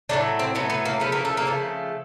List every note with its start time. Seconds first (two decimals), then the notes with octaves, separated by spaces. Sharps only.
0.09 A2 F#3 A3 D4
0.39 C4
0.55 A2 F#3 A3 B3
0.70 B3
0.85 A#3
1.00 C#3 F3 A3 B3
1.12 A#3
1.25 A3
1.37 A#3
1.45 C#3 F3 A3